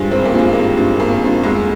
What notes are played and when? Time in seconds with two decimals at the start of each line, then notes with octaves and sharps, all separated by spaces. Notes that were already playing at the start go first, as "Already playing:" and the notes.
Already playing: G2 F3 G3 G#3
0.11 G#1 C4
0.25 A#3
0.33 G2 F3
0.39 G#3
0.53 G#1 A#3
0.77 G2 F3
1.00 G#1 A#3
1.22 G2 F3
1.43 F1 G#3